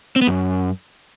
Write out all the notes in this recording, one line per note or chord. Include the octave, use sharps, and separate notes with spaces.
C4
B3
F#2